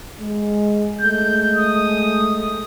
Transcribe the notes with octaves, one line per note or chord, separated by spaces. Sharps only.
G#3
G#3 A3 G6
D#6